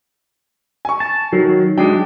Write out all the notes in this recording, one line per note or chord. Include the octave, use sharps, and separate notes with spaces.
G#5 C#6
A5
D#3 F#3
F#3 G#3 D4 G5